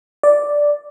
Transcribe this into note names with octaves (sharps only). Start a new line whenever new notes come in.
D5